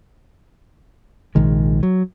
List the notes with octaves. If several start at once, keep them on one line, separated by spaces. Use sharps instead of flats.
A#1 C3 D#3 G#3
F#3